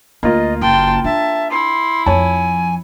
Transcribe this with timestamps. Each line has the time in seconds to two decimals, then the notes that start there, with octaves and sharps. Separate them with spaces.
0.23 D2 A#3 F4 D#5
0.61 F#1 G5 A5 C6
1.04 D4 E5 A5
1.51 E4 C6
2.06 F2 F3 C#5 G#5 A5